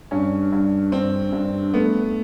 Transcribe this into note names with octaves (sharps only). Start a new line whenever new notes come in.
G2 C#4
G2
G2 C4
G2
A3 B3